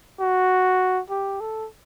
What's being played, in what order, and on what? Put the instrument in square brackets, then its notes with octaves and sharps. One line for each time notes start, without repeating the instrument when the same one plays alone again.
[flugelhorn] F#4
G4
A4